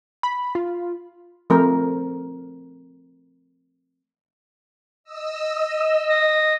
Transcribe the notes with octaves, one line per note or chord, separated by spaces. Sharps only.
B5
F4
F3 A3 C4 A#4
D#5 E6
D#5